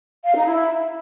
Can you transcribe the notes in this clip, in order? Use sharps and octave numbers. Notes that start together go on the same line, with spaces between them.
F5
D#4
E4